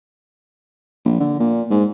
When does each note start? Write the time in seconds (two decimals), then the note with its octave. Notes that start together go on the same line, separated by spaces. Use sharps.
1.05 A#1
1.20 D3
1.40 A#2
1.70 G#2